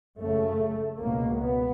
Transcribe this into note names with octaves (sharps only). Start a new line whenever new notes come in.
F#2 C#3 A3
C#2 B2 A#3
B3